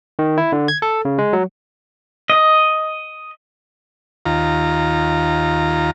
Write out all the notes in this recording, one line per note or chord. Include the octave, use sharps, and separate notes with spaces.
D#3
E4
D3
G#6
A4
C#3
G#3
F#3
D#5
D#2 F4 A#5